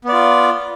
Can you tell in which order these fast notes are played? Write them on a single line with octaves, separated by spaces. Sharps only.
B3 D5 F4